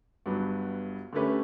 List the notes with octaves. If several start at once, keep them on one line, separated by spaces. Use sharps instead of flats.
G1 G2 F#3 B3
D3 A3 C#4 G4 B4